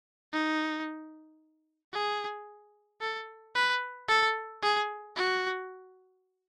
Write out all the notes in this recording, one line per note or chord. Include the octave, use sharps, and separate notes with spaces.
D#4
G#4
A4
B4
A4
G#4
F#4